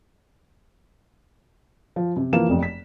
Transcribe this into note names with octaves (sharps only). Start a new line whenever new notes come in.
F3
C3
E3 F3 A#3 E7
F1 F2
B6